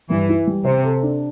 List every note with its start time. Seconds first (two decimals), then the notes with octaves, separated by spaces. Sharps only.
0.10 G2 E3
0.29 E4
0.47 G3
0.65 C3 C5
0.84 A4
1.03 D4